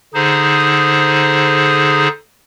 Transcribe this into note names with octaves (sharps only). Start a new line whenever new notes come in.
D3 D#4 G#4 C5